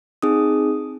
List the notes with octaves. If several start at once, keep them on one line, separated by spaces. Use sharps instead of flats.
C4 D#4 G#4 D#6